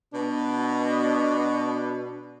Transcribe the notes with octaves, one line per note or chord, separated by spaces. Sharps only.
B2 D4